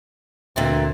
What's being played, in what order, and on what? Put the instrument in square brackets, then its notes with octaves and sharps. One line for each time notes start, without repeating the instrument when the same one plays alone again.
[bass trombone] D2 [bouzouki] A#2 E3 C4